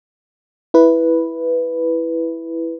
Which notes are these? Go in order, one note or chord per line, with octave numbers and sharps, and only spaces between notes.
E4 B4